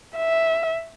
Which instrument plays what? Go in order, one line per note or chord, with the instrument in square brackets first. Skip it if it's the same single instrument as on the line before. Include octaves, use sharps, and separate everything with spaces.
[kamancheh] E5